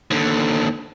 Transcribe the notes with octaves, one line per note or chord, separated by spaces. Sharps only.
D#2 D3